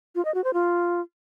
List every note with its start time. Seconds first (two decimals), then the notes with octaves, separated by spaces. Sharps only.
0.15 F4
0.25 D#5
0.34 F#4
0.44 C5
0.53 F4